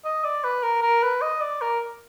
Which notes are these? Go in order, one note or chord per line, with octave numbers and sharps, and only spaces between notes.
D#5
D5
B4
A#4
A#4
B4
D#5
D5
A#4